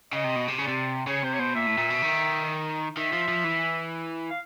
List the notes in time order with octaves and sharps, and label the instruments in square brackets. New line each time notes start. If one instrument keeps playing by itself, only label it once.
[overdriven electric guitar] C#3 [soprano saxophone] D#5
[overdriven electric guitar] C3
B2
C3
[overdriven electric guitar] C#3 [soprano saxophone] D5
[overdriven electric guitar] C3
[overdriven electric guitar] C#3 [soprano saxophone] C#5
[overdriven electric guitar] C3 [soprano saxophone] C5
[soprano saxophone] C#5
[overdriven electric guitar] B2 [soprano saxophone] C5
[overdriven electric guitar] A#2 [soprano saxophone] E5
[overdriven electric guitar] A2
A#2
B2
D#3
[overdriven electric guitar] D#3 [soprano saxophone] E5
[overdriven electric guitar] F3
F3
E3
[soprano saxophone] F5